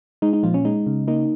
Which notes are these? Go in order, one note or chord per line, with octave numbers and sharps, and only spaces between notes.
G#3 D#4
D#4
A#2 F3 F4
C#4
G#3 D#4
C#3
A#3 D#4